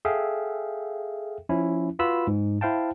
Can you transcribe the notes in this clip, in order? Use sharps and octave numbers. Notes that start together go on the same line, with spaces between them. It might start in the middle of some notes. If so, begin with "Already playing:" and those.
G#4 A4 E5 F5 G5
F3 C#4 E4
F4 F#4 B4 B5 E6
G#2
E4 C5 F5 G5 A5